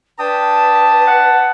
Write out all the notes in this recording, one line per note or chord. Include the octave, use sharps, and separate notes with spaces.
D4 B4 G5 A5 D#6
F#5